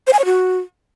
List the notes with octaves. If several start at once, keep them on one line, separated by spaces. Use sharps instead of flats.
C5
G#5
C#5
F#4